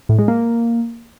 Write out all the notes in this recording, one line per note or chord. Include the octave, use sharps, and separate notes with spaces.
A2
G#3
A#3